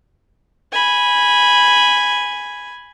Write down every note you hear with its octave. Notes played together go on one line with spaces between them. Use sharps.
G#5 B5